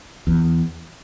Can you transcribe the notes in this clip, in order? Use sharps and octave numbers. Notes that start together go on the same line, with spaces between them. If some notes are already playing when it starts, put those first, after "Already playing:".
E2